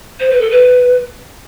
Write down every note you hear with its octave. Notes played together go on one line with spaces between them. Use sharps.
C5
B4
A4
B4